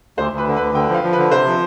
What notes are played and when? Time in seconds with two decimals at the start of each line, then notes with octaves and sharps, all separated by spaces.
0.18 D2 C5
0.33 D2 B4
0.47 D3
0.56 B4
0.61 D2
0.75 D3 G5
0.89 F3
0.94 F5
1.03 F3
1.13 B4
1.18 D3
1.31 C3 C5
1.46 F3